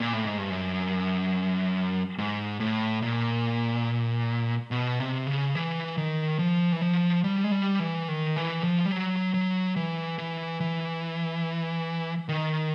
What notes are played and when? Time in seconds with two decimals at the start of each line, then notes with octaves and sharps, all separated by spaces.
0.00 A#2
0.13 A2
0.25 G#2
0.38 G2
0.50 F#2
2.18 G#2
2.60 A2
3.02 A#2
4.71 B2
4.99 C3
5.27 C#3
5.55 E3
5.98 D#3
6.39 F3
6.72 E3
6.82 F3
7.24 G3
7.44 G#3
7.52 G3
7.80 E3
8.08 D#3
8.36 E3
8.64 F3
8.86 G3
8.92 F#3
9.34 F#3
9.76 E3
10.18 E3
10.60 E3
12.29 D#3